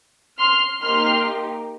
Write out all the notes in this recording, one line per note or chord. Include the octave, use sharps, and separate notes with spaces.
C6 F6
A#3 D#4 G4 C6 F6